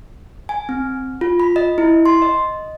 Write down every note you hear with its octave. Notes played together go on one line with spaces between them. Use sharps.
G#5
C4
F4
B5
D#5
E4
C6
D#5